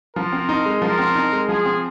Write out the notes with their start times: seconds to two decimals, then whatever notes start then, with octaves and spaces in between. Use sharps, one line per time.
0.16 F3 A#4
0.33 C4
0.49 D#4
0.65 G#3
0.82 F3 A#4
0.99 C4
1.15 D#4
1.32 G#3
1.48 F3 G#4
1.66 C4